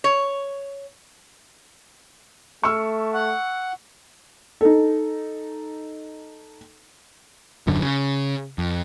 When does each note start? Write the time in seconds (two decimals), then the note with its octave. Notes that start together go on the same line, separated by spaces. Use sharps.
0.04 C#5
2.63 A3 C#6 E6 F6
3.14 F#5
4.61 D#4 A4
7.67 D#1 F#2 D3
7.82 C#3
8.58 F2